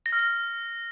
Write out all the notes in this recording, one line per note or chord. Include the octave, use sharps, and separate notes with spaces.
A#6
F6
A#6